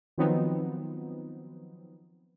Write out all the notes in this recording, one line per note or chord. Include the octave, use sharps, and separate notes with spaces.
D#3 F3 F#3 B3 C4 D#4